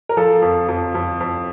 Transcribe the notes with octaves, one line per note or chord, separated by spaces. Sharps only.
A#4
F3 A4
F2
F2
F2
F2